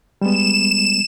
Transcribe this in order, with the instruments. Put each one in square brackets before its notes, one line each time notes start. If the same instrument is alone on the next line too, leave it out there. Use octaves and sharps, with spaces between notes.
[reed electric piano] G3 G#3 B3 [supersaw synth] E7